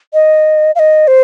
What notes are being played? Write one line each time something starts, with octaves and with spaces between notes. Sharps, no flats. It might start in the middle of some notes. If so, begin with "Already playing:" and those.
D#5
F5
D#5
C5